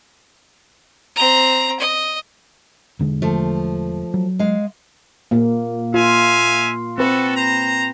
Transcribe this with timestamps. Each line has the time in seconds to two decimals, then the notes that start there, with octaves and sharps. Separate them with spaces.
1.16 C4 A#5
1.80 D#5
2.99 E1 D3 G#3
3.22 F3 A3
4.14 F#3
4.39 G#3 F5
5.31 A#2 A#3
5.94 F4 E5 F5 G#5
6.98 C4 F#4 A4 B4
7.36 C5 A#5